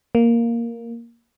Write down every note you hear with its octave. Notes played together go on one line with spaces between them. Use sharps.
A#3